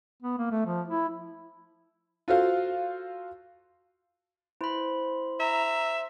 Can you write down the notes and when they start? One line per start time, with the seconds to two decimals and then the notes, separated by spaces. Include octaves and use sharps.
0.22 B3
0.38 A#3
0.51 A3
0.66 F3
0.88 E4
2.28 F4 F#4 A4 C5 F5
4.61 E4 C5 B5
5.40 E5 A#5